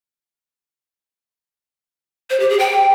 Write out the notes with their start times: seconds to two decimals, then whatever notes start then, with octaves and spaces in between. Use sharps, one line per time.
2.30 C5
2.40 G4
2.50 G#4
2.59 G5